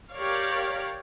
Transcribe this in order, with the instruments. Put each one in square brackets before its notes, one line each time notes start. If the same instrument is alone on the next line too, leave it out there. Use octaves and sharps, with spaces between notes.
[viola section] G4 A#4 C#5 D5 F5